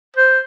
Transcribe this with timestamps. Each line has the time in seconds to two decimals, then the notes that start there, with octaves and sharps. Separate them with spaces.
0.17 C5